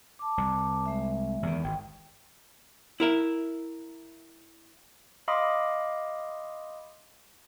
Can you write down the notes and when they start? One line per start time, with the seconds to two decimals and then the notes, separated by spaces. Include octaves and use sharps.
0.19 A5 D6
0.38 C2
0.86 G#3 E5
1.43 E2 D#3
1.64 G#1 G5
3.00 E4 A#4 E5
5.28 D#5 F5 B5 C6 D6 D#6